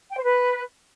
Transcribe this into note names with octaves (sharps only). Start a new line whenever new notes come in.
G5
C5
B4